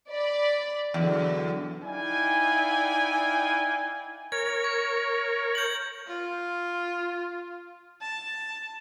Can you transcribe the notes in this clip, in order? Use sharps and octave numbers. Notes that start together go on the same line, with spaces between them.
D5 B5
E2 D3 F#3
D#4 E4 D5 F5 G5 G#5
A#4 C#5 G#6
C#6
G6 F#7
F4
A5